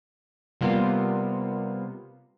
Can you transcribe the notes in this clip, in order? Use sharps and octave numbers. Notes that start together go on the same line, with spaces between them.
C3 G3 A#3 B3 F4